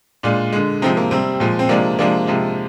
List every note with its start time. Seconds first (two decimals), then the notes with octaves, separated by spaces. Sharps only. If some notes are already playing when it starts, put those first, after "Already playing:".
0.23 A#2 G#3 D4 F4
0.53 D3 G#3
0.82 C3 F3 G#3 C4 D#4
0.97 A#3
1.11 C3 G3 C4
1.40 A#2 F3 G#3
1.59 C4
1.69 C3 F3 G#3 A#3 D4
1.99 C3 F3 G#3 A#3 D4
2.27 C3 F3 G#3